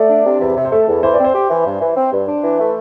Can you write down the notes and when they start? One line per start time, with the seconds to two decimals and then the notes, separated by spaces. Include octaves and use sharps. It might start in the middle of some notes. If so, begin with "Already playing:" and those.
Already playing: A3 D5
0.09 D4
0.26 C3
0.41 E2 E5
0.56 C3
0.65 C5
0.72 A3 A4
0.88 E2
1.03 E3 C5
1.14 D5
1.19 C4
1.24 C5
1.34 G4
1.50 E3
1.66 G2
1.81 E3
1.96 C4
2.12 G2
2.27 D4
2.44 E3
2.60 A3